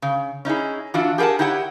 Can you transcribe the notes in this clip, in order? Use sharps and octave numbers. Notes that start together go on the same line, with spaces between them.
C#3
C#4 D#4 E4 G#4
E3 D4 F4 F#4 E5
G4 G#4 A#4 F#5 A5
D#4 E4 G4 C#5 F#5